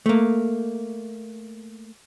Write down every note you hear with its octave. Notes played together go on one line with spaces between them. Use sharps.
A3 A#3